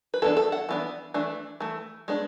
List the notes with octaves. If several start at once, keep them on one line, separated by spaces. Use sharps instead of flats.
B4
E3 B3 D4 A4
A4
F#5
E3 B3 D4
E3 A3 D4
E3 A3
G#3 B3 D4